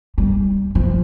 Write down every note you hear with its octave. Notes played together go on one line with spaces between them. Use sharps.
G3
F3